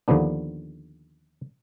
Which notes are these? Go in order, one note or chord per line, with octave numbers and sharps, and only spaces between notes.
D#2 D3 F3 B3 D4